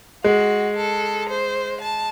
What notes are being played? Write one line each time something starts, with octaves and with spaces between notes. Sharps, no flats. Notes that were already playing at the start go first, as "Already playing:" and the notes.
G#3 F#4
A4
C5
A5